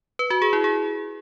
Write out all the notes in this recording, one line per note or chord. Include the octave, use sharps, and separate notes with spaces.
B4
F#4
G#4
E4
G#4